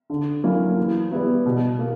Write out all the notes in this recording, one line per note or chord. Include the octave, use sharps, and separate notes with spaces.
D3
F#3 A#3 C#4 E4
E3
G3 B3 E4
B2
A#3